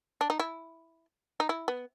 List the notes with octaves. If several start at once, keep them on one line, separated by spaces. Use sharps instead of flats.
D4
D#4
E4
D#4
E4
B3